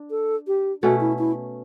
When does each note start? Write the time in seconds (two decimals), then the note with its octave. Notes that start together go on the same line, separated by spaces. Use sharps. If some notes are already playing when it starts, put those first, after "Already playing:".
Already playing: D4
0.10 A4
0.47 G4
0.83 B2 A3 C#4 F#4
1.00 E4
1.19 E4